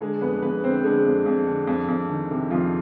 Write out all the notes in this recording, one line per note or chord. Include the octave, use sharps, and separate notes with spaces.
D3 G#3 G#4
F2 B3 B4
F2 B3 B4
D3 C4 C5
D3 G#3 G#4
F2
F2
D3
F2
F2
D#3
C3
F2 F3 F4